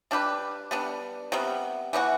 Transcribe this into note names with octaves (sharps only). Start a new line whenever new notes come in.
G3 D4 G4 B4
G3 B3 D4
C3 G3 B3
E3 B3 D4 F#4